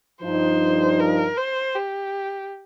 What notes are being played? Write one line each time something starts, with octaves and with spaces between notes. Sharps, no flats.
G2 F3 D#4 C5
A#4
C5
G4